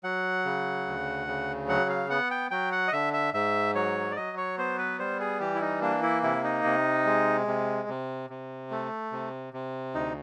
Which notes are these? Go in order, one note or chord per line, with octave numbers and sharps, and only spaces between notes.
F#3 F#5
C#3
D2
C#3
F#3 F#5
F5
B3 F#5
G5
F#3 G5
F#5
D#5
D3 E5
E5
G#2 E5
F#3 C#5
D5
F#3 D#5
C#5
B3 C5
B4
G3 C5
G#4
E3 G4
E4
D#4
A#3 D4
E4
C3 E4
D#4
C3
G#3
C3
C3
C3
A3
C3
C3
D2 D#4